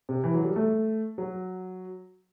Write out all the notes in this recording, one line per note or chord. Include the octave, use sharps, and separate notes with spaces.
C3
E3
F#3
G3
A3
F#3